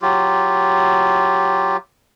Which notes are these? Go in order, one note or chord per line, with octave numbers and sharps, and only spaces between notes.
F#3 F4 G4